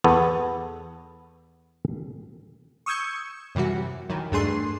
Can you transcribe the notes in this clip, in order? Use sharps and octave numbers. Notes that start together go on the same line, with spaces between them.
E2 B3 A4
C#6 D#6 E6 G6 G#6 C#7
F#2 C3 E3 G3 F#4
F#2 D#3 E3
E2 G2 A3 D4 G#4 C6